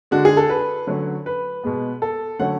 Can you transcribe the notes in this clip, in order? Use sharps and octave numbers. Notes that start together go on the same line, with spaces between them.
D3 G#3 D4 F#4
G#4
A4
B4
D3 F#3 A3 C#4
B4
B2 G#3 B3
A4
D3 F#3 A3 C#4 F#5